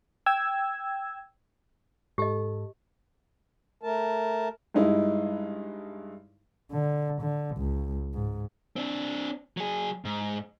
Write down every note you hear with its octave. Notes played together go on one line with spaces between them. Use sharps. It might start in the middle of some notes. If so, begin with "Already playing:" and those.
G5 E6 G#6
G#2 G4 A4 D#5
A3 A#4 A5
G2 G#3 D#4 E4
D3
D3
C#2
G#2
C4 D4
F#3 G#4
G#2